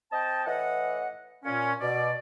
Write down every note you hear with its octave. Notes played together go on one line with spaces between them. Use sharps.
C4 D#5 G5 A5
A2 E3 D#5 F#5
A#2 C#4
B2 D5